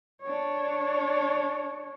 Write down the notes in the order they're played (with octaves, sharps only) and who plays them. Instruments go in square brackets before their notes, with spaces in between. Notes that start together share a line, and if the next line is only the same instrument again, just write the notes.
[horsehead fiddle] D4 C#5